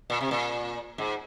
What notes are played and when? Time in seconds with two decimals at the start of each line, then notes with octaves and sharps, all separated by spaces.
0.10 A#2
0.21 C3
0.31 A#2
0.98 G#2